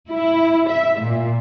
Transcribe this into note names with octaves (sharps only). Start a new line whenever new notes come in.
E4
E5
A#2